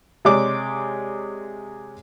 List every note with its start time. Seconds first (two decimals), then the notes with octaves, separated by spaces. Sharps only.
0.25 C3 G#3 C#5 D5 D6